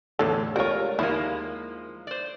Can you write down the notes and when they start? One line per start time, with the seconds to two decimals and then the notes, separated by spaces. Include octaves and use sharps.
0.19 E2 A2 D3 A4
0.56 C#2 G3 F4 A#4 C#5
0.99 D#2 F3 G#3 A#3 E4
2.07 C5 D5